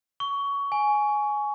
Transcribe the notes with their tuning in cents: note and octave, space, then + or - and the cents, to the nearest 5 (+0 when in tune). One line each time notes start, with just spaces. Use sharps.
C#6 +20
G#5 +10